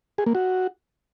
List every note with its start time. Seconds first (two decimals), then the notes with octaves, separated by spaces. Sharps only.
0.18 G#4
0.26 A#3
0.35 F#4